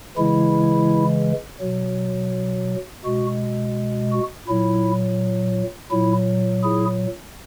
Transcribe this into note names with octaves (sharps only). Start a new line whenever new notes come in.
C#3 E3 G#3 E4
B2 F#3
B2 G#3 F#4
F#4
A#2 F#3 E4
A#2 F#3 E4
E4 G#4